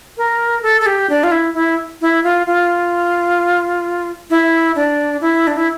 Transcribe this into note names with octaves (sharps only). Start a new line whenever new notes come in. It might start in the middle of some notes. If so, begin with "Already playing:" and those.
A#4
A4
A4
G4
D4
F4
E4
E4
E4
F4
F4
E4
D4
E4
D4
E4